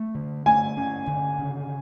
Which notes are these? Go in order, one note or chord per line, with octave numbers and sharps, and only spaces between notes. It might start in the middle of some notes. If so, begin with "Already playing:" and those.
Already playing: A3
D3
A3 G#5
C#4
D3
C#3